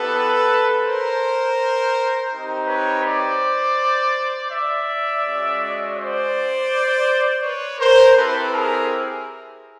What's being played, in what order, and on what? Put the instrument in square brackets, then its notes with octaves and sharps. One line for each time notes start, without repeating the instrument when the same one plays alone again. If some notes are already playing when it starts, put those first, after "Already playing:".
Already playing: [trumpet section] B3 E4 G4 A4 B4
A#4 C5
C4 D#4 G4
B4 C#5
C5 D5
D5 E5
G#3 C#4 F#4
C5 D5
B4 C#5
A#4 C5
C4 E4 G4 A4 B4
G#4 A#4